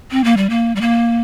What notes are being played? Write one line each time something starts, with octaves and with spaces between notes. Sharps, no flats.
C4
A#3
G3
A#3
G3
A#3